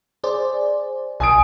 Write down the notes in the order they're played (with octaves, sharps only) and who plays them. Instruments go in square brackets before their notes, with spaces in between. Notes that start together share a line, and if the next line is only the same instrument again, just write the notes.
[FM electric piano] G#4 C5 D5
[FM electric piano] B1 [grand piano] G#5 D#6 D7